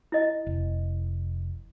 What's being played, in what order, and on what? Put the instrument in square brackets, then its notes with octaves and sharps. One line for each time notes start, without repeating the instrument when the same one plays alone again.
[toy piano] E4 D#5
[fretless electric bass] F1